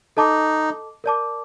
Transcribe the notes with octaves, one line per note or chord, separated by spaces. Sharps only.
D#4 A4 D#5 A5 D6
A#4 D5 A5 D6